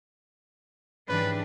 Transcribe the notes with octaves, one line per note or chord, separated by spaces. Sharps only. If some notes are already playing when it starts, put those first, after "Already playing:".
G#2 E3 G3 C#4 D4 B4